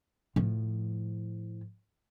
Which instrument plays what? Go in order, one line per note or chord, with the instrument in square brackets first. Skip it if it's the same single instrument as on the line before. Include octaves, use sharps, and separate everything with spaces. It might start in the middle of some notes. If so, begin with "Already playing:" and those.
[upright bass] A2 F3